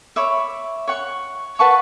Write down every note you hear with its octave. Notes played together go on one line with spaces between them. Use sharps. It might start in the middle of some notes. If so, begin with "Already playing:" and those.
C#5 E5 B5 D6
C#5 F#5 C#6
B4 F#5 A5 C#6